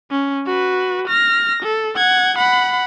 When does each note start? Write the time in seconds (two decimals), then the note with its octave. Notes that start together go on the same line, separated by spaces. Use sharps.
0.11 C#4
0.46 F#4 B4
1.08 F6 A#6
1.63 A4
1.96 F#5 G#6
2.38 F#5 B5